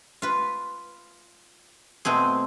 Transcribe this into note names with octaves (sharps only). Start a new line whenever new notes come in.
F4 B4
B2 A3 C4 G#4